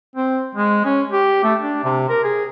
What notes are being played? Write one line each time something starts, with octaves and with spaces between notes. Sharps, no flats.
C4
G#3
C#4
G4
A3
D4
C3
A#4
G#4